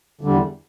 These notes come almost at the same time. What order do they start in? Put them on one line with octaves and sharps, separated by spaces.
D3 G3 E2